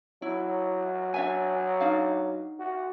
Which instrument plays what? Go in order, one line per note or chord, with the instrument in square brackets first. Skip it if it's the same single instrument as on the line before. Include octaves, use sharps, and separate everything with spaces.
[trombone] F#3 [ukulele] E4
[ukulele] D4 E5 G#5
D4 D#4 F5
[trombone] F#4